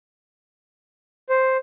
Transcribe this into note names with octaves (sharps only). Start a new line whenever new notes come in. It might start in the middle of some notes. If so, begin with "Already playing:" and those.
C5